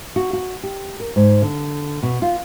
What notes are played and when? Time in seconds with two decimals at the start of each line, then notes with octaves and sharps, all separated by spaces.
0.16 F#4
0.33 F#4
0.63 G4
1.00 A#4
1.16 G#2
1.42 D3
2.03 B2
2.22 F4